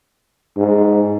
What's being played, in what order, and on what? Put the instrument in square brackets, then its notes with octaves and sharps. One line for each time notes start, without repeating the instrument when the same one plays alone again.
[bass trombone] G#2